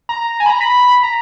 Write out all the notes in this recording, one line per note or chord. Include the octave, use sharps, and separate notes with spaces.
A#5
G#5
B5
A#5
B5
A#5